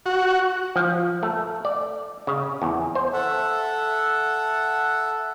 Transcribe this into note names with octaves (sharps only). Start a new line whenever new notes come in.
F#4
F3
A3
D5
C#3
E2
C5
A4 E5 F#5